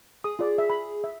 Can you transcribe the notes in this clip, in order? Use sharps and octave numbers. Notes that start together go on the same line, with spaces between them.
G#4 D#6
F4 D5
E5
B5
E5